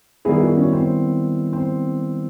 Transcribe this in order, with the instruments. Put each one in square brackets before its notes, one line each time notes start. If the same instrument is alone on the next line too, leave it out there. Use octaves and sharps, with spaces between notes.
[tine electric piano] D#3 G3 B3 E4 [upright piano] G#4
[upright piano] F#4
C#4
C4
C4